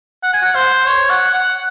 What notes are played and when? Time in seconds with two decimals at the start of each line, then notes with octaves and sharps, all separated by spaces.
0.23 F#5
0.33 G#5
0.43 F#5
0.55 C5
0.87 C#5
1.10 F#5
1.34 F#5